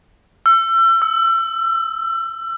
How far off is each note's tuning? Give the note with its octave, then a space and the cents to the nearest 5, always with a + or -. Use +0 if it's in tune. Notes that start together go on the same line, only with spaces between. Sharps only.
E6 +35
E6 -15